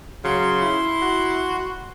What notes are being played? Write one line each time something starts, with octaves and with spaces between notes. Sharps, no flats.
C#3 F#3 C6
E4
F#4